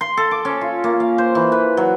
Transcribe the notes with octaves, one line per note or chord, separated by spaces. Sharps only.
C6
A4
D6
C#4
F4
A#3
F5
C5
E3
B4
F#3